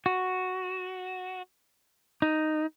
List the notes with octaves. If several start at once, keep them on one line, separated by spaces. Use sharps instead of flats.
F#4
D#4